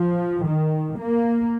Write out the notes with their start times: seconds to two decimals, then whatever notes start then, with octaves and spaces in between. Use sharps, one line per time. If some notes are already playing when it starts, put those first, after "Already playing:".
Already playing: F3
0.45 D#3
0.99 A#3